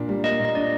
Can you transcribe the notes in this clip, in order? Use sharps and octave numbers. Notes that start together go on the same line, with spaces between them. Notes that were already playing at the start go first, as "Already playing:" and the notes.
Already playing: A#2 A#3 D4
G3
A#3 D#5
A#2
D#5
D4 D5